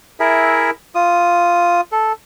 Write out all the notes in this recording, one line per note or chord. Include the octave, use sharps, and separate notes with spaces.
E4 G#4 A#4 E5
F4 D#6
A4